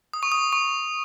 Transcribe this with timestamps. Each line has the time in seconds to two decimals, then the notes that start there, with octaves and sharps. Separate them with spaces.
0.13 D#6
0.23 C#6
0.32 D#6
0.53 C#6